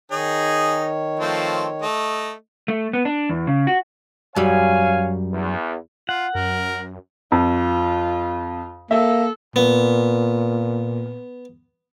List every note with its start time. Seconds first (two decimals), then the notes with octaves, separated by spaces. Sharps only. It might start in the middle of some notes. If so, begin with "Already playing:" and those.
0.11 D#3 D#4 G#4 C#5
1.20 F3 A3 C4
1.82 A3 D#5
2.68 A3
2.93 B3
3.05 D4
3.29 E2
3.47 C#3
3.67 F#4
4.36 F#2 G3 C#5 F5 G#5
5.33 E2
6.09 F4 F#5
6.35 F#2 A#4
7.32 F2 F4
8.91 A#3 A4 E5
9.56 A#2 B3